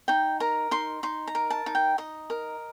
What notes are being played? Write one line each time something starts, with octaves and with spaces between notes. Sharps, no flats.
D#4 G5
A#4 A#5
D#4 C6
D#4 C6
A#5
A#4
A5
D#4
G5
D#4 D#5
A#4